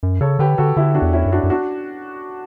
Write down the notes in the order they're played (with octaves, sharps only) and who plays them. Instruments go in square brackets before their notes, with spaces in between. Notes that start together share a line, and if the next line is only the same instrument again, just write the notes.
[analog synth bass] F#2
[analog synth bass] C#3 [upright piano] A4 C#5
[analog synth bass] D3 [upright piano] G4 B4
[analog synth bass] D3 [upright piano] F#4 A4
[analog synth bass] D3 [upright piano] E4 G4
[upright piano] D4 F#4
[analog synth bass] E2
[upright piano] C#4 E4
[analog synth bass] F#2
[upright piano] D4 F#4
[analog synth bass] F#2
[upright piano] D4 F#4